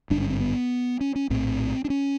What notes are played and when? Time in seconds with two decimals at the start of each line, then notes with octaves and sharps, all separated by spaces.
0.10 G#1 G2 D3 D4
0.21 C#4
0.30 C4
0.40 B3
1.01 C#4
1.16 C#4
1.30 A#1 A2 C4
1.85 D4
1.90 C#4